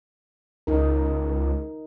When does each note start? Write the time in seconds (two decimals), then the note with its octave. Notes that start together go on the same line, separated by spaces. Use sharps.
0.67 C#2 D#4 A#4